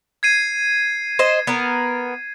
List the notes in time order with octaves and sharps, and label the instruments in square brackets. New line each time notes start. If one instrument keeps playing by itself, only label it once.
[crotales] G#6 C7 D#7
[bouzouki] C5 D#5
B3 A#4